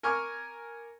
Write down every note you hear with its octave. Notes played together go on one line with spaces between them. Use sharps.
A#4 G#5 C#6 D6 F6